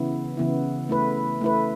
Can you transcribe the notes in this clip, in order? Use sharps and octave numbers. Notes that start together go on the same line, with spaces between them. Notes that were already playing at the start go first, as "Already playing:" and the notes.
Already playing: C#3 E3 B3 E4
C#3 E3 B3 E4
A3 E4 B4
A3 E4 B4